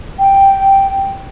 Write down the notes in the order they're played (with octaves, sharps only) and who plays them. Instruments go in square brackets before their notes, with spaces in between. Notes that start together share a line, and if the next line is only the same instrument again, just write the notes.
[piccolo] G5